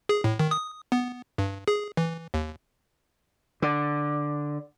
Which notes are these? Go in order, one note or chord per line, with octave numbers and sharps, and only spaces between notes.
G#4
A2
D#3
D#6
B3
G2
G#4
E3
D#2
D3